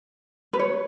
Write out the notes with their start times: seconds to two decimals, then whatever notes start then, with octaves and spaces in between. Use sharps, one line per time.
0.53 B4
0.59 C#5